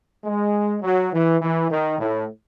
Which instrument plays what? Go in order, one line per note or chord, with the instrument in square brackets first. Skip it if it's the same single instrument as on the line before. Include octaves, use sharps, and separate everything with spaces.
[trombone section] G#3
F#3
E3
E3
D#3
A2